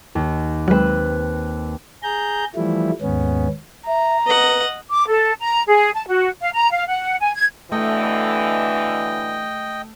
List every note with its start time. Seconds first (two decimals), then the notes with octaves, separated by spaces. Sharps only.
0.15 D#2
0.68 F#3 G#3 C4 B4 F#6
2.03 G#4 A#5 G6
2.56 E3 F3 G3 A3 E4
3.01 D#2 G#2 B3 C#4
3.87 E5 A#5
4.26 B4 D#5 F#5
4.90 D6
5.08 A4
5.39 A#5
5.67 G#4
5.94 A5
6.07 F#4
6.41 F5
6.54 A#5
6.71 F5
6.87 F#5
7.21 G#5
7.36 G#6
7.72 B2 D3 E3 A3 D#5 G5